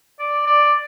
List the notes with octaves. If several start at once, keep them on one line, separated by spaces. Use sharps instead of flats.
D5
D5